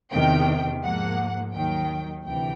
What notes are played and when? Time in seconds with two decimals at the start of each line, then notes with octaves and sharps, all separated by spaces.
0.12 E2 C3 D#3 G5
0.83 G#2 F3 A#3 F#5
1.53 D#2 D#3 F#3 G5
2.24 D2 C3 E3 G5